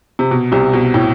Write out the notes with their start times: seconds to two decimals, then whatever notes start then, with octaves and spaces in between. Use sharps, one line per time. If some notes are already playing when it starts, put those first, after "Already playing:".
0.19 C3
0.31 B2
0.52 C2 C3
0.73 B2
0.94 A2